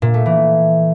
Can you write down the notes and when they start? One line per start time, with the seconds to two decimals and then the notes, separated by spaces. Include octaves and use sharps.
0.02 A#2
0.14 A3
0.26 E3